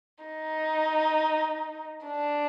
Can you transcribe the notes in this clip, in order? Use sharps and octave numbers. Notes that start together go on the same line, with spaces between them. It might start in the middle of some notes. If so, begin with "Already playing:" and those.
D#4
D4